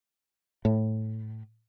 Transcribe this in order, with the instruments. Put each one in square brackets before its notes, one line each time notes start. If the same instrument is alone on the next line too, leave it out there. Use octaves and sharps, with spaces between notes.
[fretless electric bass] A2